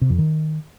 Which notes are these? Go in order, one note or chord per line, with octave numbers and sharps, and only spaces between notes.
C3
F2
D#3